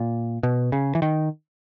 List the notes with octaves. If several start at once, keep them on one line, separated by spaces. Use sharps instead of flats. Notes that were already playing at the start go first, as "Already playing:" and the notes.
Already playing: A#2
B2
C#3
E3
D#3